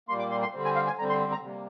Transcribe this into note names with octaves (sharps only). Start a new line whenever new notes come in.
A#2 G3 A#3 C6
D6
C6
C6
D3 G3 C4
G#5
F5
G#5
D3 G3 C4 A#5
C6
A#5
C3 G3 A#3